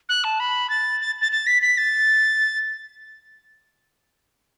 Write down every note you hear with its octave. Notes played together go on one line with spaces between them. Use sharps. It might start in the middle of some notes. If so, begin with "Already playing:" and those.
F#6
A5
B5
A6
A6
A6
A6
B6
B6
A6